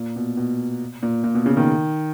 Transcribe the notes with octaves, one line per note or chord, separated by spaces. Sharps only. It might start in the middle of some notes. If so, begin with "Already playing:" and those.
Already playing: A#2
B2
B2
A#2
A#2
B2
C#3
D#3